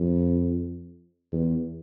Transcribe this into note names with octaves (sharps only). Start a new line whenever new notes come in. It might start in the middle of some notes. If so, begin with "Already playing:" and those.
Already playing: F2
E2